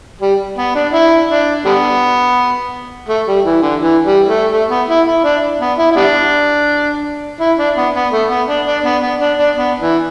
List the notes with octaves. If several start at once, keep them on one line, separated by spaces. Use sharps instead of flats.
G3
B3
D4
E4
D4
D3 G3 B3
A3
G3
E3
D3
E3
G3
A3
A3
B3
E4
E4
D4
B3
E4
E4
G3 B3 D4
E4
D4
B3
B3
A3
B3
D4
D4
B3
B3
D4
D4
B3
E3